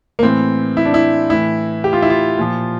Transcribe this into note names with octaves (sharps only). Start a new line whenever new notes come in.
A#3
A2 E3 C4
E4
D4
E4
A2 E3 E4
G4
F4
E4
F4
A#2 F3